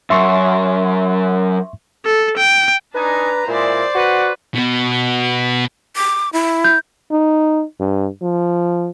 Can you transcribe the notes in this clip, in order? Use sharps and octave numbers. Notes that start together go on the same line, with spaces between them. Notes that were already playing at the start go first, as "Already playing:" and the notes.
F#2 E5 C6 C#6
A4
G5
D4 D#4 B4 G#5 A#5
A#2 G#3 E4 C5 D5
F#4 B4 F#5
B2 B3
D6
E4
G6
D#4
G2
F3